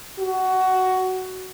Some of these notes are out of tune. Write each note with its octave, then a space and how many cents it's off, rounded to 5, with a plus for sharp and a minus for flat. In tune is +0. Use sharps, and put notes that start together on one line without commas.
F#4 +15